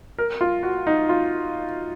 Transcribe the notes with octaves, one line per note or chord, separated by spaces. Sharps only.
A#4
F4
F#4
D#4
F4